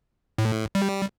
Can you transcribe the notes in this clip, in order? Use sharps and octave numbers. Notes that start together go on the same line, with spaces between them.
A2
G3